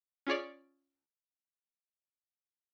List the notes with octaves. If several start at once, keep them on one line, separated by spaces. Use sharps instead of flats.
C#4 F4 G#4 C#5 D5